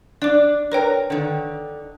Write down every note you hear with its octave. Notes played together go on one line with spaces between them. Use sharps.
D4 D5 D6
A#4 B4 C#5 G5 A#5
D3 D#3